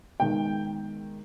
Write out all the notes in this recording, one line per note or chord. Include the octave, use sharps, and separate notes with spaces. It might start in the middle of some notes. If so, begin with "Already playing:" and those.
D#3 G#3 B3 G5